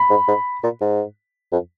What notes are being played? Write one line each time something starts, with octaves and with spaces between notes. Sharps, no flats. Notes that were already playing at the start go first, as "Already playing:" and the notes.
Already playing: B5
G#2
G#2
A#2
G#2
F2